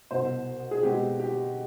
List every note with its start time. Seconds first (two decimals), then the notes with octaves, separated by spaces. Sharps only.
0.11 C2 B2 B3 C5
0.71 G#4
0.83 B2 G#3 C4 G4
1.20 G4